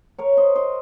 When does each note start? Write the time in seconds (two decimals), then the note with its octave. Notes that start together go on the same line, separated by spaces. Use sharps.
0.18 A#4 C#5
0.37 C5 D#5
0.55 C5 D#5